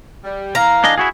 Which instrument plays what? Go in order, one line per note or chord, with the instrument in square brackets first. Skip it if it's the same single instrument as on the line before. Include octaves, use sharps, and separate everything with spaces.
[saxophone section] G3
[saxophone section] E3 F5 [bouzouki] A#5
[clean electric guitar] D4 G#4 D#5
E4 F#4 G#4